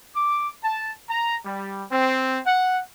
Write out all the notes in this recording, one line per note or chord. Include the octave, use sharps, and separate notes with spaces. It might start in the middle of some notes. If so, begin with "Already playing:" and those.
D6
A5
A#5
G3
C4
F#5